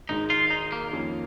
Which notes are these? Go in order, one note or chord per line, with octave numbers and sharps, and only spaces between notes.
G#1 G#2 D#3 G#3 D#4
F4
D#4
A#3
F2 D#3 A#3 C#4 F4